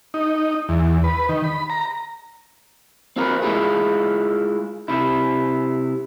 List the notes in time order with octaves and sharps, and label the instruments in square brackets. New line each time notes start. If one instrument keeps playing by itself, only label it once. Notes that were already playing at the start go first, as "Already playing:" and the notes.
[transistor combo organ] D#4
E2
B4
D#3
B5
A#5
[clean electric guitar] C4 F4 A#4 B4
G#3 E4 F4 G#4
C3 E4